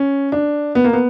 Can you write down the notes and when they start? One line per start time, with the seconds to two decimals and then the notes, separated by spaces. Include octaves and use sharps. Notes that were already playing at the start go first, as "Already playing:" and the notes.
Already playing: C#4
0.32 D4
0.75 B3
0.84 A#3
0.93 B3